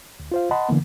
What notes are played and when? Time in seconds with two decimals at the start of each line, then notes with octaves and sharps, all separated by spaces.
0.20 D2
0.32 F4 C5 F5
0.51 D#5 F#5 A5 B5 C6
0.69 D3 E3 A#3 B3